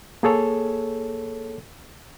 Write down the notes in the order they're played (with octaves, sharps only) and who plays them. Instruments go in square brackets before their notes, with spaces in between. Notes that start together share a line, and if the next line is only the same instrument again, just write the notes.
[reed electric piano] A#3 G#4 A4 C#5